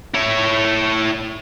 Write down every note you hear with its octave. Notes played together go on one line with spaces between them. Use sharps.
E4 C#5